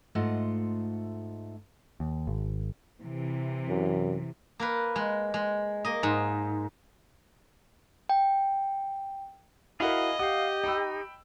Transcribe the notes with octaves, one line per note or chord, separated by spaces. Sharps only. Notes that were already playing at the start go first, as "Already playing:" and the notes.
G#2 A3 F4 D#5 F#5
D#2
G#1
C3 E3
F#2
A#3 A#4 B4
G#3
G#3
A#3 D#5
G#2
G5
E4 F#4 G#4 A#4 D#5 F5 B5
G4 F5 F#5 D#6
D#4 G5 B5 E6